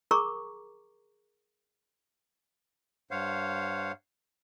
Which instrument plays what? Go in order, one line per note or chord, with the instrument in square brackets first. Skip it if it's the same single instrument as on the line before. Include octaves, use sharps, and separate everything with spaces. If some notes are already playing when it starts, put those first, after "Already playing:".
[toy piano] G#4 A#4 A#5 C#6 D6
[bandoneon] G2 C5 C#5 F5 F#5